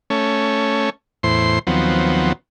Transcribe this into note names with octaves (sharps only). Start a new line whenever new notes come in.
A3 C#4
E2 A2 C5 C6
D#2 F3 F#3 B3 C4